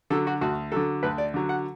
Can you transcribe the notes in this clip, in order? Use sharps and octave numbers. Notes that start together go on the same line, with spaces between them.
D3 F#3 A4
F#4
D2 F#4
D3 F#3 A4
D2 B4
D5
D3 F#3
F#5